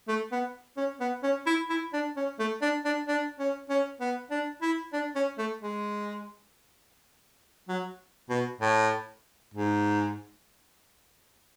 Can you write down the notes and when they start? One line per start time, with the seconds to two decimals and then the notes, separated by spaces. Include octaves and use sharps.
0.08 A3
0.32 B3
0.77 C#4
1.00 B3
1.23 C#4
1.46 E4
1.69 E4
1.93 D4
2.16 C#4
2.39 A3
2.62 D4
2.85 D4
3.08 D4
3.39 C#4
3.70 C#4
4.01 B3
4.31 D4
4.62 E4
4.93 D4
5.15 C#4
5.38 A3
5.61 G#3
7.69 F#3
8.30 B2
8.61 A2
9.54 G#2